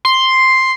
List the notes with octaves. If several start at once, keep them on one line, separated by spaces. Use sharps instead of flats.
C6